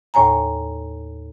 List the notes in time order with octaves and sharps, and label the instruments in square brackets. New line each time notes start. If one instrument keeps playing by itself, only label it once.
[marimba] D#2 A2 C#5 G#5 A#5